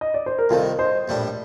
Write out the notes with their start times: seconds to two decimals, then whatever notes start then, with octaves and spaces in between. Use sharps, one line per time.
0.01 D#5
0.14 D5
0.26 C5
0.38 A#4
0.49 C2 C3 D#3 F4 A4
0.79 C5 D#5
1.08 A#1 A2 G3 D4